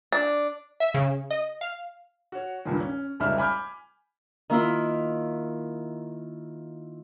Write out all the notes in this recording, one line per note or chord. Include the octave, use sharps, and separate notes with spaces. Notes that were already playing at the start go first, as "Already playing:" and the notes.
D4
E5
C#3
D#5
F5
F#4 C#5
C#2 G2 A#2 D#3
C#4
F1 C#2 G3 D#4 E5 F6
G#5 B5 D6 F6 G6
D#3 A#3 E4 F4